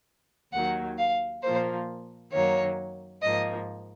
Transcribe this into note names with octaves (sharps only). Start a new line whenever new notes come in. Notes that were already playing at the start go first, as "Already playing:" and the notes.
D#2 D#3 F#3 F#5
F5
A#2 F3 A#3 C5
F#2 D#3 F#3 A#3 C#5
G#2 F3 A#3 D#5